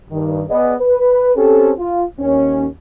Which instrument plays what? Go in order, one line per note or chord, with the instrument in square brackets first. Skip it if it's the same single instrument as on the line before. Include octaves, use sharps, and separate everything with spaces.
[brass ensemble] G2 D#3
B3 G#4 D5 D#5
B4
C4 C#4 G4 A4
F4
D#2 C#4